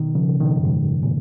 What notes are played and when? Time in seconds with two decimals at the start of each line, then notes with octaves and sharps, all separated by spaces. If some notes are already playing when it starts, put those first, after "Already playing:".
Already playing: B2 D#3
0.15 C#3 F3
0.40 B2 D#3
0.56 F#2
0.65 G#2
1.03 A#2